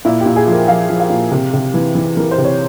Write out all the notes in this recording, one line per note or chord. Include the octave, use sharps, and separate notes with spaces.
A#2 E4
G4
A#2
G#4
F3
A#4
F3 F5
F3
F5
A#2
C3
C3
E3
E3
E3 A#4
C5
C3
C#5